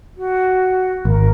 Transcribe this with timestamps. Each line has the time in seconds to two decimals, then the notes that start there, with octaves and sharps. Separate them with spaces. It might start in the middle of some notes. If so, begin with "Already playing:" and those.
0.16 F#4
1.05 G#1 A#4